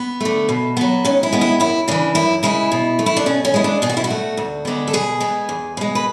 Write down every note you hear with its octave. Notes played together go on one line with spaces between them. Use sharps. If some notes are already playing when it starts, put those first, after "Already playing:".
Already playing: B3
D3 A3
B2
F#3 B3
G#2 C#4
E4
G#3 B3
E4
F#2 E4
C#3 E3 D4
F#2 E4
C#3 G#3 E4
B2
A3
E4
D4
B2 C#4
C#4
G#3 B3 E4
D4
B2 G#4
F#4
E4
F#4
A3
D2
D3 G#3 B3
A4
B2 G#4
G#3 B3
E2
B2 G#3
B4